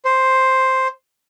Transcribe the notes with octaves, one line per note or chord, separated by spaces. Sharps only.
C5